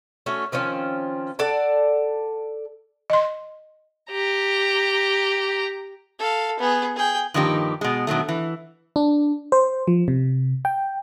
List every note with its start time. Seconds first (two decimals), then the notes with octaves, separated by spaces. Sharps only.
0.26 A3 C#4 F#4 C#5
0.52 D#3 F3 C4 C#4
1.39 A4 D5 F#5 A5
3.10 D#5 C6
4.11 G4 A#5
6.19 A4 F5
6.60 B3 G#4
6.96 G#4 G5
7.34 G2 D#3 F3 A#3 D#4 G4
7.81 B2 G#3
8.07 B2 D#3 F#3 A3
8.29 E3
8.96 D4
9.52 C5
9.87 F3
10.08 C3
10.65 G5